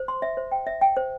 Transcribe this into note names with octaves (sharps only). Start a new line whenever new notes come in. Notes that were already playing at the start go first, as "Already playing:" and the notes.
Already playing: C5
C6
E5
C5
G5
E5
G5
C5